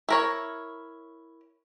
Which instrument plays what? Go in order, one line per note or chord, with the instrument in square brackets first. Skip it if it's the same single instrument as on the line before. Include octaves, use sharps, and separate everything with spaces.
[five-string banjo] E4 A#4 C#5